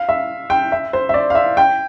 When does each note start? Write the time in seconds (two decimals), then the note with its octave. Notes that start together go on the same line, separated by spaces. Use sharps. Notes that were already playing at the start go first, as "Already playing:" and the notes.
Already playing: F5
0.09 E5
0.50 G5
0.72 E5
0.93 C5
1.09 E5
1.14 D5
1.30 F5
1.35 E5
1.57 G5